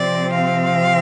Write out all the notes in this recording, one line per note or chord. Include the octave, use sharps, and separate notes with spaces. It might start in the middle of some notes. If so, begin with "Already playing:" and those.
Already playing: C3 F3 C4 D5
F5